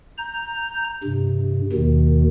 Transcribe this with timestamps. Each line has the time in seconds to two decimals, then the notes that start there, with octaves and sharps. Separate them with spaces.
0.17 A#5 G6
1.04 G2 C3
1.73 D#2 B2 D#3